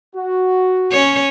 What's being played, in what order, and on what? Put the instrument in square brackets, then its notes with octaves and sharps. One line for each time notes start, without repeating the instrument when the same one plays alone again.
[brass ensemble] F#4
[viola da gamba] C#4 C#5